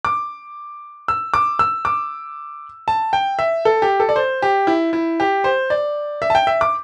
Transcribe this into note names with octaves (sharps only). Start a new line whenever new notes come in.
D6
E6
D6
E6
D6
A5
G5
E5
A4
G4
A4
D5
C5
G4
E4
E4
G4
C5
D5
E5
A5
G5
E5
D6